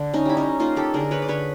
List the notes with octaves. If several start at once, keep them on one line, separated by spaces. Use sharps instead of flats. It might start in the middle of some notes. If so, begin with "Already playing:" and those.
Already playing: D3
C#4 D#4
G3 E4
C#4 D#4
A#3 D#4 F4
G4 A4
D3 G#4 A#4
B4 C#5
D5
D3 B4 C#5